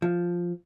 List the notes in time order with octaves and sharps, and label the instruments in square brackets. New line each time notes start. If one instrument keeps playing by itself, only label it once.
[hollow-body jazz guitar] F3